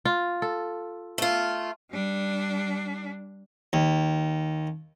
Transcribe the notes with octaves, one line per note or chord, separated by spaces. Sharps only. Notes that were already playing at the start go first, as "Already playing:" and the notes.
F4
A4
A3 F4
G3 D4
D#2